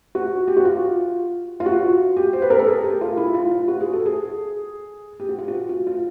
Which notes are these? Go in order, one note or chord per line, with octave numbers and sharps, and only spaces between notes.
F#4
G4
F#4
F4
F4
F#4
G4
C5
B4
A#4
A4
G#4
G4
F4
E4
F4
F4
F#4
G#4
A4
G#4
G4
F#4
F4
F#4
F4
F4